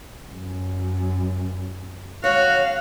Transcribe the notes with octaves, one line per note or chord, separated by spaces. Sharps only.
F#2
F#4 C#5 F5